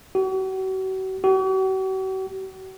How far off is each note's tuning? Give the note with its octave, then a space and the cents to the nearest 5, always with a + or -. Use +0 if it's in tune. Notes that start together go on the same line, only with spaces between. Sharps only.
F#4 +40
F#4 +45